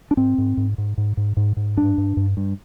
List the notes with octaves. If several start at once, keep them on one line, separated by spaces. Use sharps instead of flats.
D4
G#2 C4
G#2
G#2
G#2
G#2
G#2
G#2
G#2
G2 D4
G2
G2
G2